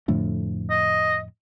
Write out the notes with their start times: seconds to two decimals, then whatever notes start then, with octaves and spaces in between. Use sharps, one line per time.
0.08 F2 A2 D3
0.70 D#5